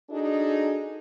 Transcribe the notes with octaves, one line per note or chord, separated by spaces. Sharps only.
D4 D#4 F#4 G#4 A4 D#5